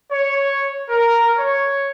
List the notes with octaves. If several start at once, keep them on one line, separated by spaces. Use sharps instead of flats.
C#5
A#4
C#5